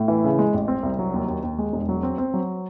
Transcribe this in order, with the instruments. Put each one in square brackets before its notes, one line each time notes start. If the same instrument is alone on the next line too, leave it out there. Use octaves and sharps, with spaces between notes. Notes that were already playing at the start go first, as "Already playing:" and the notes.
Already playing: [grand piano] A2
E3
C#3
G#3
A1
C4
C2
F#3
D#2
D#2
D#2
G#3
E1
F#3
C4
C4
F#3